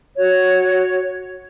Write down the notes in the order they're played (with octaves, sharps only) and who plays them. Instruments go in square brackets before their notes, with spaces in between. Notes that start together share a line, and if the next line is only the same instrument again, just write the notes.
[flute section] F#4 C#5